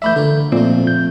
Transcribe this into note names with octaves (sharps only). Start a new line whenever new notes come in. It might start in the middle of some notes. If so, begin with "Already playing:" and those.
E3 A3 D4 E5 B5 G6
D3 F4 A#4
F2 A#2 A3 C4
G6